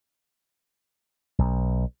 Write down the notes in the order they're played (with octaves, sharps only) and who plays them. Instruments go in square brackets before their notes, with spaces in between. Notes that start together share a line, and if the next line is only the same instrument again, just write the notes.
[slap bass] B1